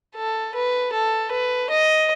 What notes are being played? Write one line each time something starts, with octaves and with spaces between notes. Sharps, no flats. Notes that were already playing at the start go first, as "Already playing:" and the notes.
A4
B4
A4
B4
D#5